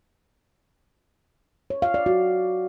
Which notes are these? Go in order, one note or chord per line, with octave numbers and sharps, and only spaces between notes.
C#5
F5
D5
F#4